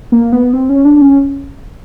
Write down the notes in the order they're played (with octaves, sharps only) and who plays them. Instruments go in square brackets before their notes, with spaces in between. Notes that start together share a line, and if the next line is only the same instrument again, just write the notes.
[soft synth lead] A#3
B3
C4
C#4
D4
C#4